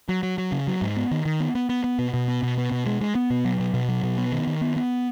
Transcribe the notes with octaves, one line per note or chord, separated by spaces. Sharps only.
F#3
F#3
F#3
C#3
F#3
G#2
B3
D#3
D#3
B3
B3
B3
B3
B2
B2
B3
B2
B3
B2
G#3
G#3
B3
B2
F#3
B2
B2
F#3
B2
B3
D#3
D#3
B3
B3